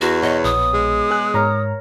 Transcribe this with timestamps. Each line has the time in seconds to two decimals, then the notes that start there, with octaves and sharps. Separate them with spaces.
0.01 E2 F#4
0.23 B2 B3 C#5 D#5
0.44 A#1 D#6
0.74 G#3
1.11 G#4 F#6
1.34 G#2 A#4 C#5 A#5